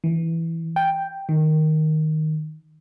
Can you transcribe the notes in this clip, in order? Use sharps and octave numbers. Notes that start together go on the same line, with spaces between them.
E3
G5
D#3